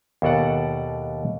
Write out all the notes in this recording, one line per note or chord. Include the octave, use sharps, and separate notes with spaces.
D#2 B2 A4 D5 F#5